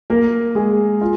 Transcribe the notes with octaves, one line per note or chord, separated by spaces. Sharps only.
A#3 A#4
G#3 G#4
F4